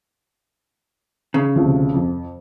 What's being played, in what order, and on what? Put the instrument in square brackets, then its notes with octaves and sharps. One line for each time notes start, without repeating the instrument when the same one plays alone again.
[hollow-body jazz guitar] C#3
[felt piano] D2 C3 F3
F2